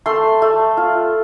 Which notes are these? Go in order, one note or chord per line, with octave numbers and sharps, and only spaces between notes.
A3 C6
A3
F4